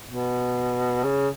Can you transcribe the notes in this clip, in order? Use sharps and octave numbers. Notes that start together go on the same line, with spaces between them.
B2
C#3